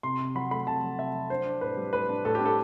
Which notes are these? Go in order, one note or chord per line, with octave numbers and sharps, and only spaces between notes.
C3 C6
C3
F#3 B5
A3 B5
C3 A5
F#3
C3 E5
F#3
D4 C5
D4
A2 B4
G3
A2 B4
D4
A2 A4
G4
D4
A4